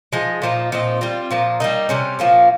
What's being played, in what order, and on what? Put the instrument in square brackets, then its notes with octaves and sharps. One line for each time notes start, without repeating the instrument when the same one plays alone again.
[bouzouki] F3 G#3 D#4
A#2 F3 A#3 D#4
A#2 F3 C4 D#4
G3 C4 F4
A#2 F3 A#3
G3 A#3 D#4
C3 G3 C#4
A#2 F3 A#3 C#4